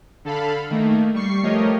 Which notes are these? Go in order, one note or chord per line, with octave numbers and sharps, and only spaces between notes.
D3 A4 F5 B5
D#3 A3 A#3
G3 C#6 C7
F3 A3 G4 A#4 C#5 D#5